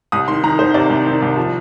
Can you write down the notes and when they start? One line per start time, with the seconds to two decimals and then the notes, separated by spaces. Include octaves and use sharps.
0.12 C2 D#6
0.28 D#3 C6
0.43 D#3 A#5
0.59 D#3 C5
0.74 C3 D5
0.90 C2
1.06 D#3
1.22 C2
1.37 F3